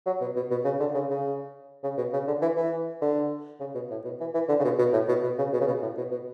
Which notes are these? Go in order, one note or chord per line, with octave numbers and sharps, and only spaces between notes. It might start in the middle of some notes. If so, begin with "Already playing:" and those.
F#3
B2
B2
B2
C#3
D3
C#3
C#3
C#3
B2
C#3
D3
E3
E3
D3
C#3
B2
A2
B2
E3
E3
D3
C#3
B2
B2
A2
B2
B2
C#3
B2
C#3
B2
A2
B2
B2